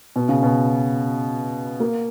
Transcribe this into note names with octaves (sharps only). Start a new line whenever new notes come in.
B2
C#3
B2
A#3